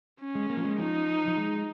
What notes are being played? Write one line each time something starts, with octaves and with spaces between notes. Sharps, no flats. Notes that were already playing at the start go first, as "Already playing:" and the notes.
C#4
G#3
A#3
F3
G#3
F3 D#4
F3
G#3